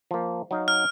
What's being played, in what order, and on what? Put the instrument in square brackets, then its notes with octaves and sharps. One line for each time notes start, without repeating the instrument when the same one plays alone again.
[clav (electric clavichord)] F3 A#3
F#3 D#4 F5
[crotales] F6